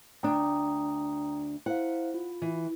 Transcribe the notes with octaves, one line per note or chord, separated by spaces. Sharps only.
D2 D4 G5 A#5 D#6
E4 C5 F5 F#5
F4
E3